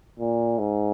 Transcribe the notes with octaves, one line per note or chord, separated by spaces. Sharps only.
A#2
G#2